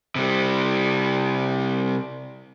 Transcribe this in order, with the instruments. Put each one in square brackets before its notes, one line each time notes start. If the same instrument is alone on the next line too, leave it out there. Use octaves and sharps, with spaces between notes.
[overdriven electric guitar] C3 G3